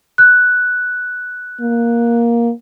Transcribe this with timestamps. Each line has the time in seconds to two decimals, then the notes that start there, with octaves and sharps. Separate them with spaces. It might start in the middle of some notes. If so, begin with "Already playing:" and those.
0.18 F#6
1.61 A#3